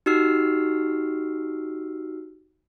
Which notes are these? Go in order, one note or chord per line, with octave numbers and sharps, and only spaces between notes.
D#4 F#4 G4 E6 F6 C7